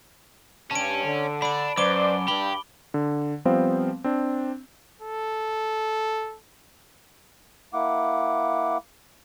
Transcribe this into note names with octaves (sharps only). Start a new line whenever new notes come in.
G2 C#4 A5 D7
D3
D4 B5 D7
F#2 B4 C5 D5 D6 D7 G7
G2 G4 B5 G7
D3
F3 G3 B3 C4 C5 F5
C4 D4
A4
A#3 E4 F#5 D6